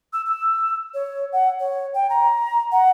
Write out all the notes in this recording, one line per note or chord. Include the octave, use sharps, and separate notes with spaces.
E6
E6
C#5
F#5
C#5
G5
A#5
F#5